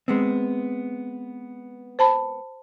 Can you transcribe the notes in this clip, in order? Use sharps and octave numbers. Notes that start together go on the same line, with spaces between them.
G#3 B3 C4
C5 A5 B5